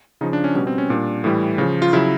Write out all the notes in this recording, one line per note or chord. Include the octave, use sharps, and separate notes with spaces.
C#3 F3 D#4
D4
C#4
B2 G3 C#4
C4
C#4
A#2 G3 D4
A2 E3 G3
C#3 F3
F4
C#3 F#3 E4